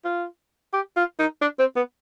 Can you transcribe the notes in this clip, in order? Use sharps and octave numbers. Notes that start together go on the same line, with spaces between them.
F4
G4
F4
D#4
D4
C4
B3